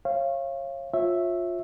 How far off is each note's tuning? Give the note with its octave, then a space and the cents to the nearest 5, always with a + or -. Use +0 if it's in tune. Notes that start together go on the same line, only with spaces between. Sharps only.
C#5 -30 F5 -25
F4 +20 C#5 -25 E5 +0